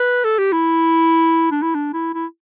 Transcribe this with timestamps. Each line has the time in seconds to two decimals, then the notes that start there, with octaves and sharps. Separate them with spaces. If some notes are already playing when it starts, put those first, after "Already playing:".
Already playing: B4
0.24 A4
0.39 G4
0.52 E4
1.51 D4
1.62 E4
1.75 D4
1.94 E4
2.14 E4